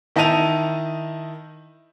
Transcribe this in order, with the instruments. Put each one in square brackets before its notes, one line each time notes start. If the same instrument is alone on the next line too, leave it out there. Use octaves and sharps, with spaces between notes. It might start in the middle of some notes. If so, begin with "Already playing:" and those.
[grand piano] D#3 E4 D#5 A5 D#7 F7